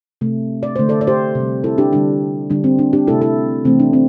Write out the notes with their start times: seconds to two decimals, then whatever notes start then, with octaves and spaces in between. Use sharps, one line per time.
0.21 C3 A3
0.63 D5
0.76 D3 A3 C5
0.89 A4 D5
1.01 D5
1.07 G4 C5
1.35 C3 G3
1.64 E4 A4
1.78 D4 G4
1.92 D3 G3 D4
2.50 D3 G3 D4
2.64 C4
2.79 D4
2.93 D4 G4
3.07 C3 A3 E4 A4
3.22 E4 A4
3.65 C3 E3 A3 C4
3.80 D4
3.93 C4